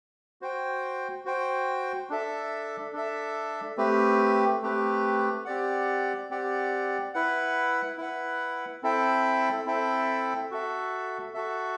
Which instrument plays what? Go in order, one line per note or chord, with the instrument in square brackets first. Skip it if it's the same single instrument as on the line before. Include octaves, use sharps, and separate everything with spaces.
[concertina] F#4 C5 G5
F#4 C5 G5
D4 A4 E5
D4 A4 E5
A3 C4 G4 B4
A3 C4 G4 B4
C4 G4 D5 F#5
C4 G4 D5 F#5
E4 B4 F#5
E4 B4 F#5
C4 E4 A4 E5 G5
C4 E4 A4 E5 G5
F#4 A4 E5
F#4 A4 E5